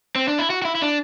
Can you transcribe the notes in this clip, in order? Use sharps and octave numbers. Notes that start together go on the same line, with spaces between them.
C4
D4
E4
F#4
F#4
E4
E4
D4